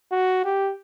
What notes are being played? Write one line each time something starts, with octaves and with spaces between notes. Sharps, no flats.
F#4
G4